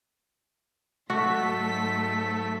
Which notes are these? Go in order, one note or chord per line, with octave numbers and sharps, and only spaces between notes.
G#2 F#3 A3 F#4 B6